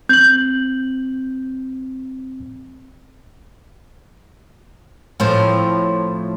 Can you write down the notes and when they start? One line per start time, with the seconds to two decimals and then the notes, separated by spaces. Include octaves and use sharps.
0.09 C4 G6 F#7
5.20 A2 F3 C4